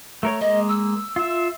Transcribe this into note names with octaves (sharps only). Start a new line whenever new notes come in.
A3 A#4 C#5
G#3 A#3 D#5
E6
F4 E5